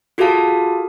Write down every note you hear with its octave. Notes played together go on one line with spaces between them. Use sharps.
F4 F#4 G#4 A4 F5 A5